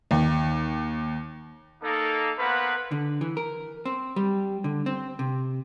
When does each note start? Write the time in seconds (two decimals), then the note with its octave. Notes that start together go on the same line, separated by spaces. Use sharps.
0.11 D#2
1.82 A#3 D#4 A4
2.38 A#3 B3 B4 C5 F#5 B5
2.91 D3
3.21 E3
3.37 A#4
3.86 C4
4.16 G3
4.64 D3
4.86 C4
5.19 C3